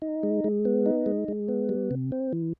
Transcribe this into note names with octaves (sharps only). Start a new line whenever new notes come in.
D#4
G#3
G#3
B3
D#4
G#3
G#3
B3
G3
C3
C4
E3